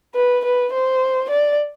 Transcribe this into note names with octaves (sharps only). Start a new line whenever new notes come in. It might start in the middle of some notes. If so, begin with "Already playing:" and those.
B4
B4
C5
D5